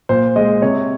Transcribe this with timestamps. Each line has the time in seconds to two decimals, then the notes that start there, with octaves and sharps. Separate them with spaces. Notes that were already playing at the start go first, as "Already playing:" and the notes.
0.09 A#2 C5
0.36 G#3 D#5
0.62 C3 C#5